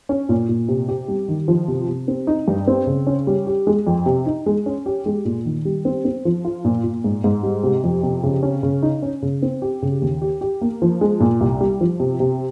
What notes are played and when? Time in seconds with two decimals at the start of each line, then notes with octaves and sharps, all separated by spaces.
0.09 C#4
0.29 A#2
0.49 A#2
0.68 C3
0.88 G4
1.08 G3
1.28 D#3
1.48 F3
1.68 C3
1.88 C3
2.08 C4
2.27 D#4
2.48 G2
2.67 C4
2.87 C#3
3.07 C#4
3.27 G3
3.47 G4
3.67 G#3
3.87 F2
4.06 C3
4.26 D#4
4.46 G#3
4.66 C#4
4.86 G4
5.06 G#3
5.25 A#2
5.45 D#3
5.65 G3
5.85 C4
6.05 C4
6.25 F3
6.45 F4
6.65 A#2
6.84 A#2
7.04 G#2
7.24 G#2
7.43 G3
7.63 C3
7.84 F2
8.03 C3
8.23 C#3
8.43 C#4
8.63 C#3
8.82 D#4
9.02 C#4
9.22 C#3
9.42 C4
9.62 G4
9.82 C#3
10.02 D#2
10.22 G4
10.41 G4
10.61 A#3
10.82 F3
11.01 G#3
11.20 A#2
11.40 C2
11.61 G3
11.81 F3
12.00 C3
12.20 C3